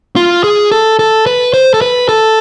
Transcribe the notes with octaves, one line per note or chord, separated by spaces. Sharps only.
F4
G#4
A4
A4
B4
C5
A4
B4
A4